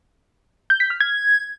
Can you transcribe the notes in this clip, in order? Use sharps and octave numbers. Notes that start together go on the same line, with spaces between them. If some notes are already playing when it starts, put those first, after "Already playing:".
G6
B6
F6
G#6